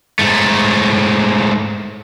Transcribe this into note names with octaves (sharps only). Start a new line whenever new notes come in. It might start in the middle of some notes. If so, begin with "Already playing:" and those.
G#2 A3